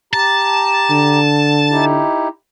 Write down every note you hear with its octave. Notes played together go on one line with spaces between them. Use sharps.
G4 A5 A#5
D3
D#4 E4 G4